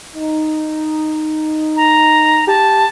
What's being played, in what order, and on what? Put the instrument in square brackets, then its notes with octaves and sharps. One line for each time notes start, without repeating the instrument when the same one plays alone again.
[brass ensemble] D#4
[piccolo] A#5
[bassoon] G4 [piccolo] A5